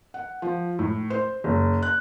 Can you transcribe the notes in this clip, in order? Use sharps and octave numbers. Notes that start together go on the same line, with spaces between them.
F#5
F3
A2
C5
F#1
F#6